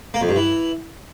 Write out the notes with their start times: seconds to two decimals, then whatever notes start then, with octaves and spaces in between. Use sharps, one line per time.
0.14 A#3
0.21 F2
0.29 G2
0.36 E3